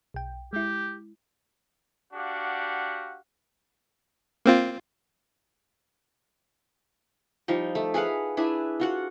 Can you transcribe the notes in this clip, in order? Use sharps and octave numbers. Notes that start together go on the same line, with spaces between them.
B1 G5
G#3 E4 G4
D4 F#4 G4 F5 F#5
A#3 C4 F4
F3 G3 D#4
A3
G#4 B4 F5 F#5
D4 E4 G#4 B4
F4 F#4 F#5